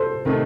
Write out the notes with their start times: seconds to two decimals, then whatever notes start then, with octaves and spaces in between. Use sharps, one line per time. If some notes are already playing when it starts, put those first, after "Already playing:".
Already playing: A4 C5
0.25 C3 D#3 A3